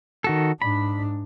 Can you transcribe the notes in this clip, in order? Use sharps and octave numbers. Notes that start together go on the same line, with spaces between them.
D#3 F#4 A4
G#2 D4 B5